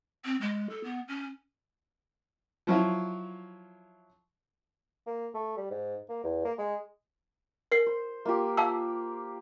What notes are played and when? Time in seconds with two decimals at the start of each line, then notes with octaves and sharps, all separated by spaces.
0.25 C4
0.41 G#3
0.70 A4
0.84 B3
1.08 C#4
2.67 F3 F#3 E4 F4
5.06 A#3
5.34 A3
5.57 G3
5.71 G#2
6.09 A#3
6.24 E2
6.45 A#3
6.58 G#3
7.72 A#4 C7
7.86 C5
8.25 A#3 F4 G4
8.57 F5 A5 E6